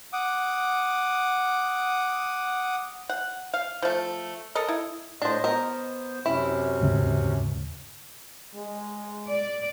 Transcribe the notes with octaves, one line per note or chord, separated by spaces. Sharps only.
F#5 D6 D#6
F#5
F5
F3 A3
A4 A#4 D#5
E4
A2 D4 C5 D#5
B3 A#4 C5 D#5
F#2 C3 C#4 E4
D#2 G#2 C#3
G#3
D5